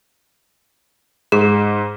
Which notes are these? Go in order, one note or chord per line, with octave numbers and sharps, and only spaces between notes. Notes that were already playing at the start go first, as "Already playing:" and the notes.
G#2 G#4